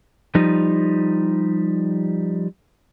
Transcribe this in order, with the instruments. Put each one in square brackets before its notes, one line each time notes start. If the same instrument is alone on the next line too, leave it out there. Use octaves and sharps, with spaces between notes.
[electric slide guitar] F3 G3 D#4